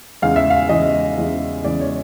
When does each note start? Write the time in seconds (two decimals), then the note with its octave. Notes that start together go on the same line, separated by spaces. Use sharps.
0.22 E2 C#3 E3 G#3 F5
0.36 E5
0.50 F5
0.69 E2 C#3 E3 G#3 D#5
1.17 E2 C#3 E3 G#3
1.64 E2 C#3 E3 G#3 D5
1.81 C#5